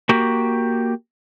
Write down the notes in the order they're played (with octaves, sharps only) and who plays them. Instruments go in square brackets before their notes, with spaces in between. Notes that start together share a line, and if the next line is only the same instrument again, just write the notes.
[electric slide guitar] A#3 F#4 G4